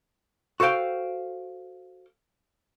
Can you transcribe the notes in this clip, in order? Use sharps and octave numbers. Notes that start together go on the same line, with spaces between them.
F#4 A4 C5 F5 G5